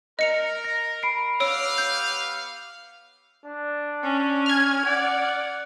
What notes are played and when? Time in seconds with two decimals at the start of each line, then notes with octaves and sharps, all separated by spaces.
0.19 A#4 D#5 C#7 F7
0.64 A#6
1.03 B5 C7 D7
1.40 B3 G4 C#5 F5 E6 D7
1.78 G6
3.45 D4
4.03 C#4
4.46 F6 G#6
4.85 D5 F#5